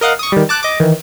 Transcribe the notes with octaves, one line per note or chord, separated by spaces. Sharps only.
A#4 D#5 F5 F#5
C#6 D#6
D#3 G3
A5 D6 F#6
D#5 D6
D#3 E3